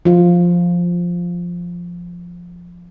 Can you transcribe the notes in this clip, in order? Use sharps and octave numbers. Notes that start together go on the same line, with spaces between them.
F3 F4